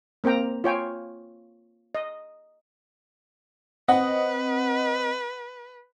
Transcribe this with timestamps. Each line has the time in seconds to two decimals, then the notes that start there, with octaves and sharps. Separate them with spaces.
0.24 A#3 C4 A#4 G5 A#5
0.64 F4 C#5 G5 G#5
1.95 D#5
3.88 C4 B4 D#5 F#5